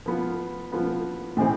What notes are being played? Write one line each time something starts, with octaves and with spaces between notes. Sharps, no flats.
F3 B3 F4
F3 B3 F4
A2 E3 G#3 C4 E4